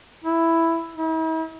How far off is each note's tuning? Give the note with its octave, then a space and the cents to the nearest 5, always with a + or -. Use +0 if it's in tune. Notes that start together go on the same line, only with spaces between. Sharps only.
E4 +5
E4 -45